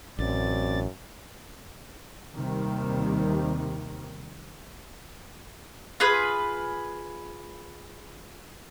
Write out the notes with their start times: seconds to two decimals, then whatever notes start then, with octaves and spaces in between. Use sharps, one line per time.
0.19 A1 F#2 C4 D5 A6
2.36 D#2 C3 D#3 G3
6.00 F4 G#4 B4 D#6